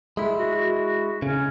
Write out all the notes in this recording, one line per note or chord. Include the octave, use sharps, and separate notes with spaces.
G#3 E4
F#4
F#4
C#3 C#4